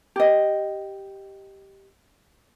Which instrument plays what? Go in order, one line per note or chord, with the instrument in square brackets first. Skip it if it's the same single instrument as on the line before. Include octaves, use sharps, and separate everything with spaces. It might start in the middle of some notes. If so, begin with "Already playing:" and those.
[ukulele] G4 D#5